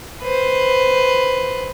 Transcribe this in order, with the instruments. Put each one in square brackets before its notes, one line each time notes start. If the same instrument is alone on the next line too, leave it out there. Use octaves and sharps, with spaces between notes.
[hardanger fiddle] B4 C5